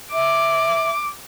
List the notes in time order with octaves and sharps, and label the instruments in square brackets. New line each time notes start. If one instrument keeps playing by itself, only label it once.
[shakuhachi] E5 [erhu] D6